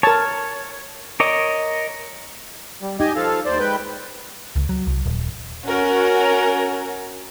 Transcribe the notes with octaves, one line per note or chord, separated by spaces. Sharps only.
A#4 C#5 A5
A#4 C#5 D#5 D6
G3
D#4 G4 D#5 G#5
F3 A4 F5
D#2 C5 D5
G#3 B4 G5
C#2
F#3
C2
D#1
C#4 F#4 A#4